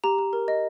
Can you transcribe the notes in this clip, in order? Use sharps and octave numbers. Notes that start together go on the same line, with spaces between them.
G4 A#5
G4
A#4
D#5